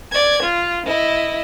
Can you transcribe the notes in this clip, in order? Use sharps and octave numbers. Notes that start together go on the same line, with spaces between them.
D5 G#6
F4
E4 D#5